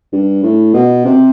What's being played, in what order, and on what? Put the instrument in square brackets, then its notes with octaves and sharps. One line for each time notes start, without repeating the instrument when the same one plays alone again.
[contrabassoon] G2
A2
B2
C3